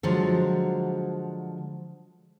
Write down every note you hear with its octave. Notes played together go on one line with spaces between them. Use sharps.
D3 F3 F#3 G#3